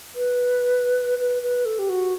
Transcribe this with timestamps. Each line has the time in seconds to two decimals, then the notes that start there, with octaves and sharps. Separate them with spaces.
0.15 B4
1.19 B4
1.43 B4
1.65 A4
1.79 G4
1.89 F#4